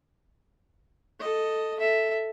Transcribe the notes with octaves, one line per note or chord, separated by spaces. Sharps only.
A4 D#5
A4 E5